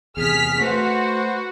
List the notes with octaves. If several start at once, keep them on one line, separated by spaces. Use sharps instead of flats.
E2 C3 G#4 F6 B6
A3 F#4 B4 C5